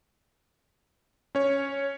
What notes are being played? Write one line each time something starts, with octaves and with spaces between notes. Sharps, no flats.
C#4 C#5